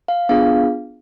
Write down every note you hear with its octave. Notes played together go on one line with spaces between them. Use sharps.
F5
B3 D4 F4 G#4 F5